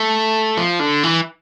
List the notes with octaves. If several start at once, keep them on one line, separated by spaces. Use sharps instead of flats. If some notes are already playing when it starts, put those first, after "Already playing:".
Already playing: A3
F3
D3
E3